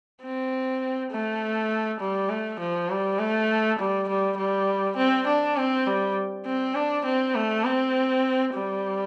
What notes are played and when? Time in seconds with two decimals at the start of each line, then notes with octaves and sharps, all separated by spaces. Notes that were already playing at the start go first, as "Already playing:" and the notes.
0.22 C4
1.11 A3
2.00 G3
2.30 A3
2.60 F3
2.90 G3
3.19 A3
3.79 G3
4.09 G3
4.37 G3
4.97 C4
5.27 D4
5.57 C4
5.87 G3
6.46 C4
6.75 D4
7.05 C4
7.35 A3
7.65 C4
8.54 G3